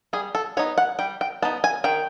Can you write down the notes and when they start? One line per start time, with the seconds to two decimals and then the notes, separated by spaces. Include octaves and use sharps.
0.13 G3 G#4
0.35 A4
0.57 B3 D#4 C#5
0.78 F#5
0.99 G3 G5
1.21 G5
1.42 B3 A5
1.45 D#4
1.64 G#5
1.84 D#3 G5